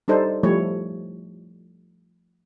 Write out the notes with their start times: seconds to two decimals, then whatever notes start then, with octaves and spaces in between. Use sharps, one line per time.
0.08 G3 D4 D#4 A4 C5
0.43 F3 G3 A3 E4 C#5